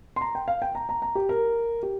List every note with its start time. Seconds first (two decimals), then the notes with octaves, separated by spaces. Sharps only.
0.16 C6
0.21 A#5
0.35 G5
0.48 F5
0.62 G5
0.75 A#5
0.89 A#5
1.02 A#5
1.15 G4
1.29 A#4
1.83 G4